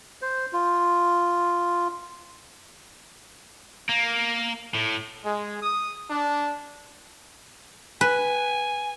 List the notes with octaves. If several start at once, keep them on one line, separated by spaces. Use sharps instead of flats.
C5
F4
A#3
A2
G#3
D#6
D4
B4 G#5